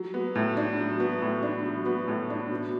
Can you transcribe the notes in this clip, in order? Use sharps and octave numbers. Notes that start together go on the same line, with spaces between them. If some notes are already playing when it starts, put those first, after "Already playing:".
Already playing: F#3
B3
A2
D4
F#3
B3
A2
D4
F#3
B3
A2
D4
B2